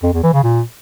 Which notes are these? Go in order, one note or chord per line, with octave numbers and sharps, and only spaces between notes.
F2
E2
E3
C#3
A#2